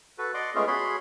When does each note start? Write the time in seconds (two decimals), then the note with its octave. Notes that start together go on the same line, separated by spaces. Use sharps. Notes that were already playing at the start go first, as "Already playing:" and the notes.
0.18 F#4 A4 B4
0.34 D5 D#5 F#5 C6 D6
0.55 G#3 A3 B3 C#4 F4 G#4
0.67 F#4 G#4 C#5 B5 C6